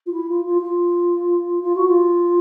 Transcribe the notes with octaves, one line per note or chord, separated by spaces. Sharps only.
F4
E4
F4
F4
F4
F4
F#4
F4